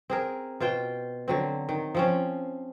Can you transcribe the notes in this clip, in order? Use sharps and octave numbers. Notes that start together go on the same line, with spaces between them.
C4 G#4 A#4
B2 F4 C5 G5
D3 F#3 C4
D#3
F3 C4 C#4